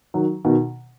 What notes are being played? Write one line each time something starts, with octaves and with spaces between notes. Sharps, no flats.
D#3 F#3
B2 D#3